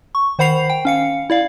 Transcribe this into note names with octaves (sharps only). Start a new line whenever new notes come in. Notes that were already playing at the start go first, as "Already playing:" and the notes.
C#6
D#3 C5 F#5 B5 C7 F7
G5
C#4 F5 C#7
E4 D5 F5